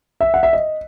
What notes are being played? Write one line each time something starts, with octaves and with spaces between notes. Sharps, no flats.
E5
F#5
E5
D#5